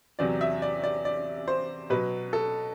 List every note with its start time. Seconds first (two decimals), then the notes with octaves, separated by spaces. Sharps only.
0.19 E2 C3 F#3 D5
0.41 E5
0.62 D5
0.84 D5
1.05 D5
1.48 C5
1.90 B2 F#3 B4
2.33 A4